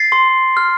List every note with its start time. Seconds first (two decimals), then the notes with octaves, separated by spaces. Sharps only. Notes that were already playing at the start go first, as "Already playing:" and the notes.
Already playing: A6 C7
0.12 C6
0.57 F6